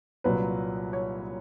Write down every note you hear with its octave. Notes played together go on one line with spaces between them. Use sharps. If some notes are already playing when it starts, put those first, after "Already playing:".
C2 A#2 F#3 B4
C#5